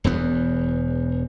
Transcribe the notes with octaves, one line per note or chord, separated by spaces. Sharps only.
E1 E2 B3